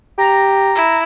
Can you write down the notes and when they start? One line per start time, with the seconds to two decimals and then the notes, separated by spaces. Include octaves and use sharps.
0.18 G4 A#5
0.75 E4